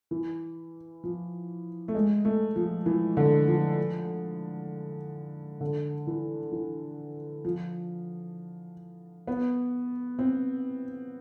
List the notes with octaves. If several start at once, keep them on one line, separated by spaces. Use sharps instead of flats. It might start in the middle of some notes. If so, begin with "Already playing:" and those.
E3
F3
A3
G#3
A3
F3
E3
D3
F3
D3
E3
E3
F3
B3
C4